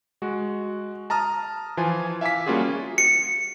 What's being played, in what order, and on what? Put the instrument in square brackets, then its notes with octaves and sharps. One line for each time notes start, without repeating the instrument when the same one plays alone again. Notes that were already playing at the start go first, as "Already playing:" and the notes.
[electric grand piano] G#3 F#4
A5 A#5 D#6 F6
E3 F3 F4 G#5
E5 F5 G#5 D6 B6
G3 A#3 C#4 F4 F#4 G#4
[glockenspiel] C#7